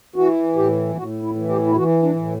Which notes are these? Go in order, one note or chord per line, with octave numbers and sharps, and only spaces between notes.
E3 F#4
A2 G4
A2 F#4
E4
E3
G4
E4
E3 F#4
D4
A2